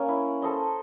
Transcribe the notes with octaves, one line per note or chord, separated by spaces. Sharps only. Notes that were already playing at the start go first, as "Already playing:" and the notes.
Already playing: A#3 C#4
E4
A4 C5 D#5